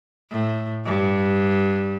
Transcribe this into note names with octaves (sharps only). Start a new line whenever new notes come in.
A2
G2